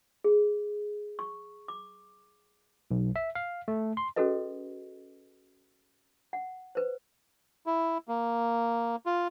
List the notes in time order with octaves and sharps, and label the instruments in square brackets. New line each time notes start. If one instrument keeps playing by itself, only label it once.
[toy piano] G#4
C#6
D6
[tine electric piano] B1
E5
F5
A3
C6
[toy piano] C#4 F#4 G#4 A4 B4 D#5
F#5
B4 C5
[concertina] E4
A#3
F4